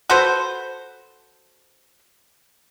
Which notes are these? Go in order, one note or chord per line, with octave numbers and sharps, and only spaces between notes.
F#4 A4 B4 C5